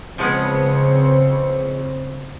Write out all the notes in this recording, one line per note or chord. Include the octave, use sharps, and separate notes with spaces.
C#3 F3 G#3 B3 C4